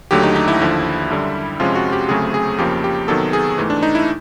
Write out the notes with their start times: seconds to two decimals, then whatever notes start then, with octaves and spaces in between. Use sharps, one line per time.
0.11 D#2 D3 F#3 A3 G4
0.23 D#4
0.36 D#4
0.48 E4
0.60 D#2 D3 F3
1.10 F#2 D3 G3
1.59 F2 C3 F3 G#3 C#4 F4
1.75 F#4
1.92 G4
2.09 D2 C#3 F#3 A3 C4 G#4
2.34 G#4
2.58 F2 C#3 F3 A#3 G4
2.84 G4
3.08 C3 D#3 F#3 B3 A4
3.33 G#4
3.58 G#2 E3 A3
3.70 D4
3.83 D#4
3.95 E4